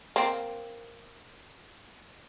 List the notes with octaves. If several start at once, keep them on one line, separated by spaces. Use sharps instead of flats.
A#3 C4